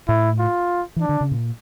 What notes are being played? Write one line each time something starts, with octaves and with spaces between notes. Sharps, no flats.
A2 E4
F4
E3 D4
D3
C#3
A#2